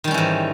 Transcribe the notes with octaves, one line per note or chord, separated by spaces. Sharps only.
G#2 D#3 E3 G3 C#4